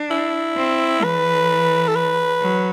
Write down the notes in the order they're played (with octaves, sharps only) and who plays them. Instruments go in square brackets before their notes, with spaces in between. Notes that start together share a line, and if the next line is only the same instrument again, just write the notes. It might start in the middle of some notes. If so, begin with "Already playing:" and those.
Already playing: [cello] D4
[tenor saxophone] E4
[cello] C4
[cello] E3 [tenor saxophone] B4
[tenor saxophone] A4
B4
[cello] F#3